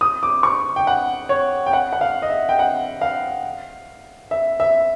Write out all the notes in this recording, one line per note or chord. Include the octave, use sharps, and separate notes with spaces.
D#6
D6
C#6
G5
F#5
C#5
G5
F#5
F#5
F5
D#5
E5
G5
F#5
F5
E5
E5